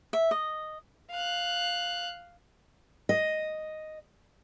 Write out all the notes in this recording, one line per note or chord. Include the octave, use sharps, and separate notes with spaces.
E5
D#5
F5 F#6
D#5